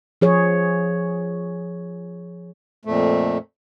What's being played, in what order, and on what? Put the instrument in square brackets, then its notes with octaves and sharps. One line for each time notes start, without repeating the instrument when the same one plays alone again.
[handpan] F3 G#4 C#5
[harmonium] F2 A#2 A3